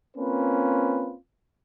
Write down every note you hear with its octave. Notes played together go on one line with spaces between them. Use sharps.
A#3 C4 C#4 F4 B4